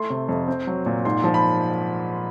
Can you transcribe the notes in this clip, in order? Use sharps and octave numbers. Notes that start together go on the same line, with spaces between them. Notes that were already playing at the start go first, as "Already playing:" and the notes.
Already playing: A3 C6
C3
F2
C4
F#3
A#2
G#2 C6
F3
B5